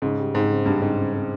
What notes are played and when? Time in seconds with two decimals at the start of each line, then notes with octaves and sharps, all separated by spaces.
0.02 G#2 C#3
0.18 G3
0.34 G#2 C4
0.50 C#3
0.66 G2 G3
0.81 G#2 C4
0.98 C#3
1.14 C4